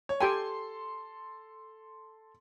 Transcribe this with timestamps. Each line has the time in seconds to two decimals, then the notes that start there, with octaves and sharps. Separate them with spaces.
0.09 C#5
0.21 G4 A4 G5 G#5 C6